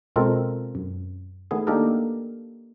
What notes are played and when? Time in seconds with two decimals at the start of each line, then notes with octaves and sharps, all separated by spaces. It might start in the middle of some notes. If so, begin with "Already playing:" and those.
0.16 B2 G#3 C4 F4 A4 A#4
0.75 F#2
1.51 D#3 A3 B3 G#4
1.67 A#3 D4 D#4 G4 A4 A#4